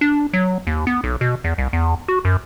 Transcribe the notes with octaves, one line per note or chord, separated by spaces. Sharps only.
D4
F#3
D#2
B3
B1
B2
E2
C2
E2
F#4
F#2